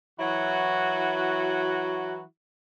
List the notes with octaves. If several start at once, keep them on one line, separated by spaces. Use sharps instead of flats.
E3 F#3 E4 F#4